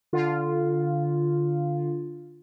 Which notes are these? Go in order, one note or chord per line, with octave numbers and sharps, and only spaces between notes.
D3 F4